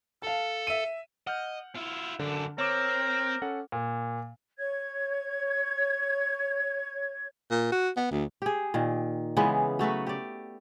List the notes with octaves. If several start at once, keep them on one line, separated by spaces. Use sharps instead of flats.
A4 F5 A5
E5 D#7
D#5 F#5 F6 G6
E4 F4
F#2 D3 D4
C4 A#4 C#5 D6
C#4 A4 F#5
A#2
C#5 G#6
A#2
F#4
B3
D2
G4 G#4
A#2 D#3
C#3 E3 G#3 B3
F#3 A3 F#4 B4
G4 D5